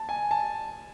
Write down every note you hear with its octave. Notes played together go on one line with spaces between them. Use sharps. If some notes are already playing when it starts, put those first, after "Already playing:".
Already playing: A5
G#5
A5